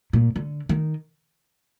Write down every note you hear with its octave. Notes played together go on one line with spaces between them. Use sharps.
A#2
D3
D#3